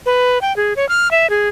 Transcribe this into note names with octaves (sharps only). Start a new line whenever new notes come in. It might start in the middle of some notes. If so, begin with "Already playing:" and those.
B4
G5
G#4
C#5
F6
E5
G#4